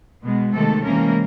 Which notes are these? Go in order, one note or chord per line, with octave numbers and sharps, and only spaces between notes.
B2 G#3 B3
C3 D#3 G#3 A3 A4
C3 E3 G#3 A#3 C#4 A#4